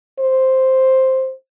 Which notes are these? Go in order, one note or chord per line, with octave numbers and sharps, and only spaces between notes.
C5